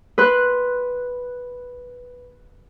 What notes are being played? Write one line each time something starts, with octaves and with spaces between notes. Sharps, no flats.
B4 C6 F#6